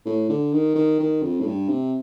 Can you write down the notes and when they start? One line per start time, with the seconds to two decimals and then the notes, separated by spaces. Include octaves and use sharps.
0.05 A2
0.29 D3
0.53 D#3
0.75 D#3
1.00 D#3
1.22 F2
1.40 A2
1.46 G2
1.69 C3